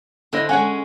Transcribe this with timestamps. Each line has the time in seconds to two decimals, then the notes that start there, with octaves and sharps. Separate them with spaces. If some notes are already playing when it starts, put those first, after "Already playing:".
0.33 D3 E4 C5 D#5
0.49 G#3 C#4 C#5 F#5 G#5